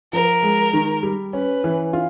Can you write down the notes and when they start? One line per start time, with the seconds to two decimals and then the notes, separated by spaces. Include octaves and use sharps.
0.13 F3 A#4
0.42 G#3
0.73 D#3
1.03 G3
1.33 C#4 B4
1.64 E3
1.93 F4